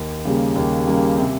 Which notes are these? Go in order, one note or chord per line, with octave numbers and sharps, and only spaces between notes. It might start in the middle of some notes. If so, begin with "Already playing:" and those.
Already playing: D#2
C#3 G3 A#3
D#2
C#3 G3 A#3
C3